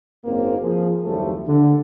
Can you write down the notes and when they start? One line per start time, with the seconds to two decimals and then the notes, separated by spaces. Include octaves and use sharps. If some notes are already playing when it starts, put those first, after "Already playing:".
0.25 F#1 G#2 A#3 C4
0.62 F3 G#4
1.04 F#1 D#2 F3 G3 A3
1.47 D3